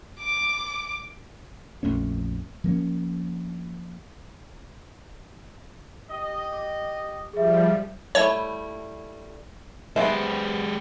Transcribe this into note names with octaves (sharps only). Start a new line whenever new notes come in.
D6 D7
A#1 F2 A3 C#4
F3 A#3 C#4
G4 D#5
D6
F3 G3 G#4 E5
G3 A3 E4 C#5
G#3 B3 G4 C5 E5